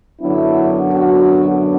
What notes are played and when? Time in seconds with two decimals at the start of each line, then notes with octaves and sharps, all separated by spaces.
0.21 F#2 D3 F#3 B3 D4 E4
0.94 F#4